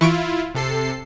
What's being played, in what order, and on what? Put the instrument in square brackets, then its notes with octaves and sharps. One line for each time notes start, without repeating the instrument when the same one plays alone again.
[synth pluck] E3 C#6 D7 [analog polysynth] E4 F4
[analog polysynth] C3 A4 C7